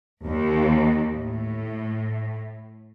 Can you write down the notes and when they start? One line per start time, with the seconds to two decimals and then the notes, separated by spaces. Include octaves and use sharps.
0.24 D#2
1.14 A2